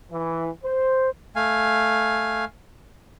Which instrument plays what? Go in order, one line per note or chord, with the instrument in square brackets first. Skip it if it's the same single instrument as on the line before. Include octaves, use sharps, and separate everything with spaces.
[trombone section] E3
C5
[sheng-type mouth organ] A3 F5 G#5